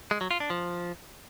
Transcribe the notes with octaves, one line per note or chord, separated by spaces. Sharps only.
G#3
F#3
F4
D4
F3